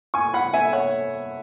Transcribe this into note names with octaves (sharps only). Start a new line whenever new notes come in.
G#5 C#6
F#5 B5
E5 G#5
C#5 F#5